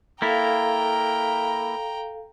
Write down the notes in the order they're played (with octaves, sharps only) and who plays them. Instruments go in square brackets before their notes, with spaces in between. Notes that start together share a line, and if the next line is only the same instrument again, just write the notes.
[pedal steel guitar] A#3 E4 [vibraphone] A4 F5 [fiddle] G5 A#5